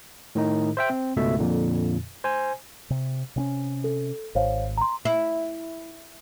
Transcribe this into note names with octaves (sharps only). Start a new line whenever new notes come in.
A2 D#3 D#4
C5 E5 G5
C4
C#2 G#2 B2 A3 E5
F2 A#2 D3
C5 G#5
C3
C3 C4 C#4
A4
G#1 C5 C#5 F5
A#5 C6
E4